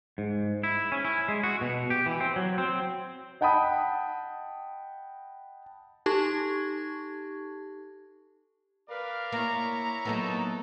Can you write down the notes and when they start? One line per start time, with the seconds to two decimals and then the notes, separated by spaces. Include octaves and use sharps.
0.18 G#2
0.63 E4
0.92 C#4
1.05 E4
1.28 G#3
1.43 F#4
1.61 B2
1.90 G4
2.06 E3
2.20 C4
2.36 F#3
2.58 C4
3.41 D#5 F#5 G5 A5 B5 D#6
6.06 D#4 G4 A4 A5 C#6 G#6
8.89 A#4 B4 D5 F5
9.32 A#3 E4 C#5 A#5
10.05 F#3 A#3 B3 D#4 A4